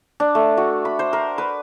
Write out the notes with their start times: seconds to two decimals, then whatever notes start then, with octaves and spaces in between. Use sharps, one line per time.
0.20 D4
0.35 A3
0.57 F#4
0.85 B5
0.99 C5
1.13 A#4
1.38 B4